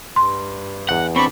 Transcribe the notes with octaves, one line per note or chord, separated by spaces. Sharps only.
G2 C6
E2 D#5 F#5 G5
C4 D4 B5 C#6